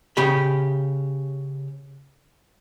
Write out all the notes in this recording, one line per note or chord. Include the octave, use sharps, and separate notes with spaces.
C#3 G4 B5